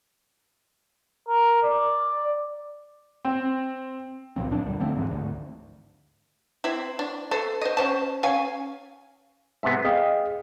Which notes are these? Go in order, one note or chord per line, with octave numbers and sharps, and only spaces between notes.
A#4
D5
C4
C#2 A#2 F3 C4
D1 A#1 F#2 D4
D2 G3
D3 F3 A3 C4
E1 G#2 E3 G#3
G#1 D2
C4 E4
D4
A4 C5
C5 D#5
C#4 C5 A5
C#4 F5 G#5
G#2 C3 B3 E5
G#4 D#5 F5 G5